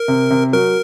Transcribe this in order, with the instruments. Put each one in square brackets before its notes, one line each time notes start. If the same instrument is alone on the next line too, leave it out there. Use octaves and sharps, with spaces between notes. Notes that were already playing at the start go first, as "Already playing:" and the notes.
Already playing: [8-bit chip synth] A#4
[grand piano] C3
C3
[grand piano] F#3 [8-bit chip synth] A#4